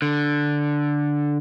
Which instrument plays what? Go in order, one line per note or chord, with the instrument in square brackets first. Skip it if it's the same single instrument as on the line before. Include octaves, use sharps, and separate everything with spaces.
[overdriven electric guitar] D3